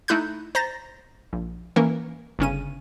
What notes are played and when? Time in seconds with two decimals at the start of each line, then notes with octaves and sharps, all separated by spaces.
0.08 A3 D#4 E4 B5 F#6 G6
0.55 C5 A#5 A6 A#6
1.33 A#1
1.76 E3 A#3 C#4 A#4
2.39 G1 C#3 C#4 D#7